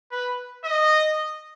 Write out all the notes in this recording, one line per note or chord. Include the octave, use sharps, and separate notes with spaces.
B4
D#5